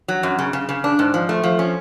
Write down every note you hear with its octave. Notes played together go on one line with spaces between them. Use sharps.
F#3
F#2
C#3
C#3
C#3
D4
G#2
F3
A3
F3
C#4